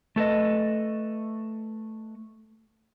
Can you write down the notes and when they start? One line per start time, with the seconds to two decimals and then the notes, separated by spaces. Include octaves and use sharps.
0.16 A3 A4 B4 D#5